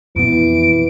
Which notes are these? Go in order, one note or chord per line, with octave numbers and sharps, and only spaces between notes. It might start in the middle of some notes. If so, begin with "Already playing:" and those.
F2 B2 E3 B3 D7